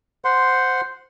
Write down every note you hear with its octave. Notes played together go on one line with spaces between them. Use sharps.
C5 F#5 C6